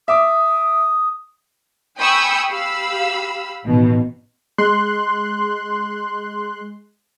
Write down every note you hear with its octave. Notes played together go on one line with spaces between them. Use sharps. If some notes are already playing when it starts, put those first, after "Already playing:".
E5 D6 D#6
G5 G#5 B5 C#6 D#6 E6
G4 F5 B5 E6
A1 B2 D#3
G#3 C6 F#6